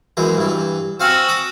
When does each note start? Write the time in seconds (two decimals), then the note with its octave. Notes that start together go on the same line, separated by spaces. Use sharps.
0.17 F#2 E3 G#3
0.37 G2 E3
1.00 C4 F#4 F5 G#5 E6
1.29 D6 D#6